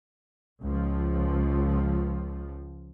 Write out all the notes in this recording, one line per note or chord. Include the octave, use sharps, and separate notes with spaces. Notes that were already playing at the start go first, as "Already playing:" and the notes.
C#2 F3